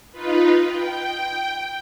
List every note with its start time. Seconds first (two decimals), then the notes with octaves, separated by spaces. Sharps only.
0.12 D#4 F4 B4
0.67 G5